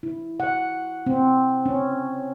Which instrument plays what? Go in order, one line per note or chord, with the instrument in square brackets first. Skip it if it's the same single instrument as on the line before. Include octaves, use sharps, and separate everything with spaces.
[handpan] E4
F#5
C4
C#4